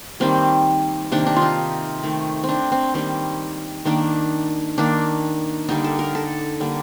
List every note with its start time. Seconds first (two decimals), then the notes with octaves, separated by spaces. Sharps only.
0.20 D#3 G3 A#3 C4
1.12 C3 D#3 A#3 D4
1.27 D4
1.36 F4
1.42 D#4
2.03 D#3 A3
2.44 C4
2.49 D4
2.72 C4
2.94 D#3 G3 A#3 C4
3.85 D#3 A#3 D4
4.78 D#3 A#3 D4
5.69 D3 G3 A#3 D#4
5.84 A4
5.99 A#4
6.15 A4
6.60 D3 G3 A#3